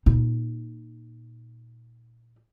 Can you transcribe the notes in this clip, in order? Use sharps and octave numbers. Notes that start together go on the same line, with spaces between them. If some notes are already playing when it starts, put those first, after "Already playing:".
A#2 D#4